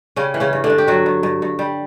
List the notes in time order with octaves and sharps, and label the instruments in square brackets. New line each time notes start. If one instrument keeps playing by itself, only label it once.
[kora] C#3 G3 C#4
E3
C#3 C#4
G2
D3 D4
G2
G4
G2 F#3 F#4
G2
G2
G2
G3